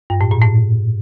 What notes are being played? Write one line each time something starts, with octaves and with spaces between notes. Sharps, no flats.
G2
A2
A#2
A2